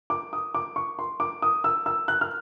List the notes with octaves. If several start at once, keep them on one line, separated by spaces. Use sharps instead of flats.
D6
D#6
D6
C#6
C6
D6
D#6
E6
E6
F#6
F6